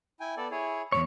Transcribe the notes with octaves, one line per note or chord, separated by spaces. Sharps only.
E4 G5 G#5
B3 A4 D5
E4 G#4 C#5
E2 G#2 C#5 B5 D6